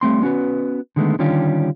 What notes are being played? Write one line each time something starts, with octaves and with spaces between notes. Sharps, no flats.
G3 A3 C4 C6
B3 C#4 F#4 B4
D3 D#3 G#3 A3 B3
D3 D#3 G3 C#4 F4 G4